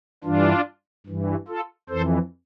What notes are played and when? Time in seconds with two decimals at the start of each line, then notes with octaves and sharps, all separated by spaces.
0.24 G2 E3 D4 F4
1.06 G2 E3
1.48 F4 A4
1.89 F2 E3 A4 C5